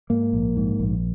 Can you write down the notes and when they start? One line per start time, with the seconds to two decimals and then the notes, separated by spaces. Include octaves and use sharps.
0.10 G#2 A#3
0.33 A#1
0.56 G#2
0.79 A#1